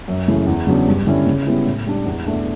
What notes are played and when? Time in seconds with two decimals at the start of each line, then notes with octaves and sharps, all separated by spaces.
0.08 F#2
0.28 C#3 E3 A3
0.47 E2
0.67 C#3 F#3 B3 D4
0.87 G2
1.07 D3 G3 C#4 E4
1.27 C#3
1.47 G3 B3 E4
1.66 A2
1.86 G3 D4
2.05 E2
2.26 B2 A3 D4